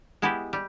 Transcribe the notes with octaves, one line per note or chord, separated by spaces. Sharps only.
G#3 B3 E4 G4 B4
G3